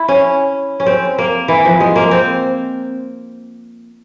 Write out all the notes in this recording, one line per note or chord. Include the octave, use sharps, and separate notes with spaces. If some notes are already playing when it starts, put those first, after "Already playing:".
Already playing: E4
C#4
C#4
C4
A#3
E3
F3
G#3
A#3
C4